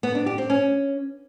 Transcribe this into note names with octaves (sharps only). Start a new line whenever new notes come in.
B3
D4
G4
C4
C#4